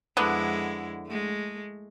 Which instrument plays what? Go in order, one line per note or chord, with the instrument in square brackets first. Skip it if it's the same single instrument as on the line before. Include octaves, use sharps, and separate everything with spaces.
[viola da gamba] F2 G#3 E4 [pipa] D3 B3
[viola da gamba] G#3 A3